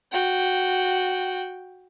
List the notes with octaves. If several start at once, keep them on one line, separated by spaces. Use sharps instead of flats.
F#4 G5